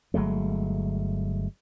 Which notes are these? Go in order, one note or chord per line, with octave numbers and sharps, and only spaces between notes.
G1 F#3 G#3 A3